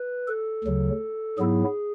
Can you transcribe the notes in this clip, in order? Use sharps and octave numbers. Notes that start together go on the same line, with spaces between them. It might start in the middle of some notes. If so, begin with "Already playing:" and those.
Already playing: B4
A4
D2 C#3 F#3
G#2 F#3 B3 E4 G#4